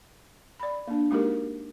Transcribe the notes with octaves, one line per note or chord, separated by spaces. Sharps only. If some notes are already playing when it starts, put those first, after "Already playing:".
D5 B5
A#3 D4
G#3 A#3 D#4 F#4 G4 A#4